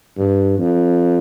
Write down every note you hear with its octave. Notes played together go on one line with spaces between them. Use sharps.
G2
F2